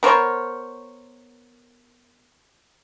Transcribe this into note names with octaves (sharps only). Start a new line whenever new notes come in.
B3 A#4 C5 C#5